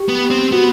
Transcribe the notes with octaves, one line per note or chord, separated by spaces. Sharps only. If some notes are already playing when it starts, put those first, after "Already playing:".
Already playing: G4
B3
C4
B3 F#4